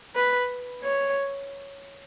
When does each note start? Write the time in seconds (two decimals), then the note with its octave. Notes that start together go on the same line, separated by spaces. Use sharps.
0.16 B4
0.84 C#5